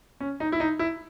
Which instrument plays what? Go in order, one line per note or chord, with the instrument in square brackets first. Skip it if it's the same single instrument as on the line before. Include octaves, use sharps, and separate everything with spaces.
[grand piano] C#4
D#4
E4
D#4
E4